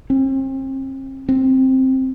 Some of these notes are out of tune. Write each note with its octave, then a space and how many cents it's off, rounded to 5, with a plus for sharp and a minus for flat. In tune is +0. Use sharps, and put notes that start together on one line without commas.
C4 +40
C4 +5